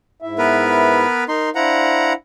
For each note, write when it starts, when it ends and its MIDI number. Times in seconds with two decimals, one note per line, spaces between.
0.22 1.05 44
0.22 1.05 64
0.22 1.05 76
0.38 1.24 59
0.38 1.24 70
0.38 1.24 71
1.28 1.50 63
1.28 1.50 70
1.28 1.50 84
1.55 2.13 62
1.55 2.13 64
1.55 2.13 72
1.55 2.13 77
1.55 2.13 78
1.55 2.13 82